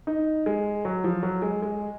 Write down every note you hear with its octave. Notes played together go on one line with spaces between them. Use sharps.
D#4
G#3
F#3
F3
F#3
G#3
G#3